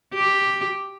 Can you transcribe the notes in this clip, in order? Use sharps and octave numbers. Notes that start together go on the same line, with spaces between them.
G4